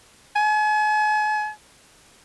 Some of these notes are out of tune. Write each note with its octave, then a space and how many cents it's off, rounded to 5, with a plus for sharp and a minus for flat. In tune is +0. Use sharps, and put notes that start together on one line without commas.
G#5 +40